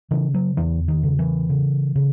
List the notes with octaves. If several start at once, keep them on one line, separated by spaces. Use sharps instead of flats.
C#3 E3
F#3
E2 E3
D#3
C#3
E3
C#3
C#3